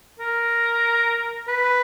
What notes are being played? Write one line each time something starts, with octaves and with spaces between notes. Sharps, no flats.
A#4
B4